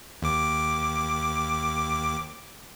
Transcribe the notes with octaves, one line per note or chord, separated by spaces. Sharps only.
D#2 D6